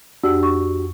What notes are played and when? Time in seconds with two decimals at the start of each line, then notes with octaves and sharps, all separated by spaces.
0.24 F2 D4 F#4 G4 E6
0.43 C#6